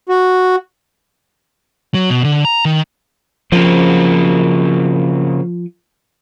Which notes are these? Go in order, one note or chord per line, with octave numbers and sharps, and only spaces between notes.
F#4
F#3
B2
D3
A#5
D#3
C#3 F3 A#3 C4